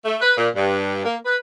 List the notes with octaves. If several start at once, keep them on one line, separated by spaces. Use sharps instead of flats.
A3
B4
A#2
G2
A#3
B4